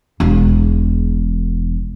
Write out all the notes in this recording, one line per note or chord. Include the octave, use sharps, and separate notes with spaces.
E1 E2